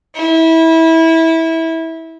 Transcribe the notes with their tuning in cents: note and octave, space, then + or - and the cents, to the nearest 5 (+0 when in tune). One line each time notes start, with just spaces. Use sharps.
E4 -20